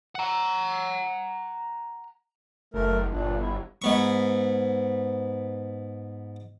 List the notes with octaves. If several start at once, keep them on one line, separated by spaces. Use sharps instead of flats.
F#5 A#5
F#1 A3 A#4
G1 A#2 D4
E4
G#2 B3 C#6